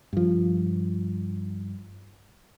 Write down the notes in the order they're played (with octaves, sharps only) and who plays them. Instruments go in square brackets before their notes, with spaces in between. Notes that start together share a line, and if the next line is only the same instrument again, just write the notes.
[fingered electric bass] G2 F3